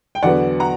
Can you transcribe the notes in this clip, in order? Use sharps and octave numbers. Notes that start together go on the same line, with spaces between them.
G5
E2 D3 F#3 B3 D5 F#5
F#5 A#5